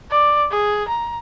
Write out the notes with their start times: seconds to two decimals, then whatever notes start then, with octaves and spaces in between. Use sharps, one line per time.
0.11 D5
0.51 G#4
0.88 A#5